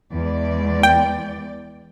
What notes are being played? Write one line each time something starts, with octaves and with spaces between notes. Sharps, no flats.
E2 G#3 D5
G5